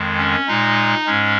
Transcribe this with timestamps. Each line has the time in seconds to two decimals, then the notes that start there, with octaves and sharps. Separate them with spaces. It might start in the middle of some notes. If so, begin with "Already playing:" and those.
Already playing: F2 D#3 G#3
0.18 C#4
0.47 A#2 G#3 D#4
1.06 G#2 G#3 C#4